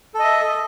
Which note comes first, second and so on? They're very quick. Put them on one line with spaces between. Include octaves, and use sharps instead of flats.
A4 D#5 E5